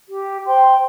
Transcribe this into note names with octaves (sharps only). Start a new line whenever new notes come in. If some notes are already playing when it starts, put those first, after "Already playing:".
G4
C5 G5 C6